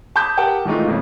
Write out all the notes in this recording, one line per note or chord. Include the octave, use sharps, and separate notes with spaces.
A5 B5 D6 D#6 G6
G4 A#4 F#5 G5 A5
D#3 E3 G#3 A3 D#4 F4
B1 F2 E3